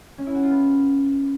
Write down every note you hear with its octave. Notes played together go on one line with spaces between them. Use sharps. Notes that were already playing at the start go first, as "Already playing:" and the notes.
C#4
E4
F#4
F4
B3